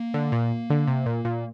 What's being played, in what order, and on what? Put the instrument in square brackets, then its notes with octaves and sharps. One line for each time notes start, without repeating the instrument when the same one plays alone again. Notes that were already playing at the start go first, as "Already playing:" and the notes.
Already playing: [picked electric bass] A#3
[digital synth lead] D3
A#2
D3
C3
A#2
A#2